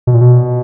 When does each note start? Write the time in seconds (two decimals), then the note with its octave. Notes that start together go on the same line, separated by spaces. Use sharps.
0.07 B2
0.14 A#2
0.21 B2